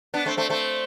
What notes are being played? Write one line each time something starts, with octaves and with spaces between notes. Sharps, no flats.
B3 D4
A3 C4
A3 C4
A3 C4